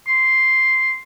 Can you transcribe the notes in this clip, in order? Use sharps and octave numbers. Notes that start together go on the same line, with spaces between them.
C6